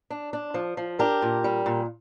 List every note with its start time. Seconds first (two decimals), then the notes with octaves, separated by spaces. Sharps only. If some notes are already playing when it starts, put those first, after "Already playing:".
0.10 D4
0.33 D4
0.54 F3
0.77 F3
0.99 D4 G4 A#4
1.22 A#2
1.44 G3
1.66 A#2